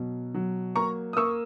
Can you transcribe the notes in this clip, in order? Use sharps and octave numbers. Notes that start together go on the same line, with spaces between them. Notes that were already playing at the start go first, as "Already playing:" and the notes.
Already playing: B2 F#3
F#3
A#3 A#5 C#6
D#6
A#3 C#6 E6